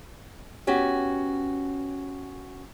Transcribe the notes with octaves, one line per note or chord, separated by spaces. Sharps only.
B3 C#4 F#4 G4